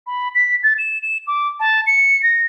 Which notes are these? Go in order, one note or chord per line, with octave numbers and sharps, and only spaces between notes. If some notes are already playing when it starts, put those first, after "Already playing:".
B5
B6
A6
E7
E7
D6
A5
C#7
A#6